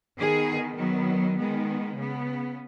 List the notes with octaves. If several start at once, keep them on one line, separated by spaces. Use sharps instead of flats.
D#3 B3 G#4
D#3 F#3 B3
D#3 G#3 B3
C#3 B3